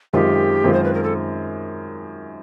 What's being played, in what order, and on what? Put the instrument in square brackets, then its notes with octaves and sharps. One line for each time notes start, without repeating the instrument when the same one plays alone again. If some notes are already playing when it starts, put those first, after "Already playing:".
[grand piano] F#2 D#3 G#3 C4 F4 [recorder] G4
[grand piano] F#2 D#3 G#3 C4 F4
[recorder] C5
B4
A#4
A4